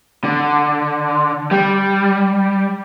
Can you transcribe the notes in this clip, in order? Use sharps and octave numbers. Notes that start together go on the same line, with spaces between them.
D3
G3